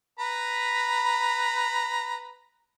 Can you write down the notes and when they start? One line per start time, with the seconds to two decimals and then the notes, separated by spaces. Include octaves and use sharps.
0.19 B4 A#5 B5